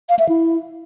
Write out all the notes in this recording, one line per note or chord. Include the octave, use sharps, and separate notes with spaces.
F5
E5
E4